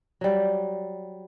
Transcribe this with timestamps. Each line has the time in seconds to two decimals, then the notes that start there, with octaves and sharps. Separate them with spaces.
0.21 F#3 G3